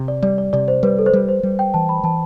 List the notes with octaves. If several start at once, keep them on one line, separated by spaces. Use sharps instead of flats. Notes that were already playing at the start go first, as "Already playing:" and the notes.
Already playing: C3
D5
G3 D5
D5
C3 D5
C5
G3 B4
A4
C5
G3 B4
C5
G3
G5
E3 A5
B5
E3 A5